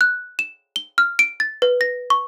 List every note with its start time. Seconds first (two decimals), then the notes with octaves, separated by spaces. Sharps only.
0.01 F#6
0.39 E7
0.76 G7
0.98 F6
1.19 D7
1.40 A6
1.62 B4
1.81 A#6
2.10 C#6